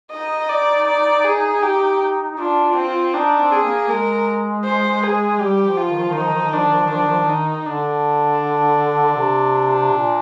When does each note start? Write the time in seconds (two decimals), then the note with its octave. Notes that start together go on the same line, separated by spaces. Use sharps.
0.11 D#4 D#5
0.49 D5
0.88 D5
1.25 G#4
1.63 G4
2.31 D#4
2.38 D4 F4
2.63 F4
2.76 C4
2.88 F4
3.14 D4 D#4
3.39 C4
3.52 G#4
3.63 A#3
3.89 G#3 A#4
4.64 C5
5.03 G#4
5.40 G3 G4
5.65 F3
5.77 F4
5.90 D#3
6.00 F3
6.09 D#3
6.16 F3 D#4
6.27 D#3
6.36 F3
6.46 D#3
6.53 F3 D4
6.64 D#3
6.74 F3
6.83 D#3
6.91 F3 D4
7.01 D#3
7.11 F3
7.20 D#3
7.29 D#4
7.66 D3 D4
9.16 C3
9.93 A#2